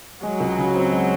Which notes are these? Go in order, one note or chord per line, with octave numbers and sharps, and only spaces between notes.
F#3 G#3
C#2
C#3
C4
G#3